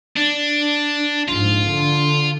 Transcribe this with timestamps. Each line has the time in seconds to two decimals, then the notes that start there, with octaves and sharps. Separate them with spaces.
0.16 D4
1.28 A#1 G#2 F4
1.70 D3